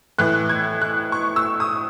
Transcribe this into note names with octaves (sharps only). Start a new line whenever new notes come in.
A2 E3 F#6
G#6
F#6
C#6
E6
D#6